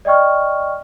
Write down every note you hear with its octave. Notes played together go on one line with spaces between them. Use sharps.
D5 D#5 G5 C#6 F6